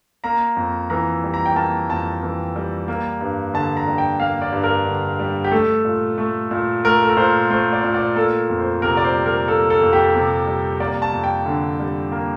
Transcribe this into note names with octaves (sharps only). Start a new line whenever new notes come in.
A#3 A#5
F2
E3 A#5
G3
A#5
G5
A#3 A5
F2 A5
E3
G3
A#3
G2
D3 A5
A#5
G3
G5
A#3 F5
D5
G2
A#4
D3
G3
G4
A3 A4
A#2
A3
A#2
A3 A#4
A4
A#4
A#2 C5
A3 C5
D5
A#2
D5
A#3 A4
F2
C5
C3 A#4
D5
C5
G3
A#4
A#3 A4
A4
F2
G4
C3
G3
A#3 D5
A5
F2
G5
D3
G3
A#3